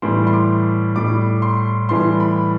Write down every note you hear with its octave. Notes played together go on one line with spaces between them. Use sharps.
A2 E3 G3 C6
C6
D6
A2 G3 D6
C6
A2 E3 G3 C6
B5